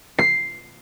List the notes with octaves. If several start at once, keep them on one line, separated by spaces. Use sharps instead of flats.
C7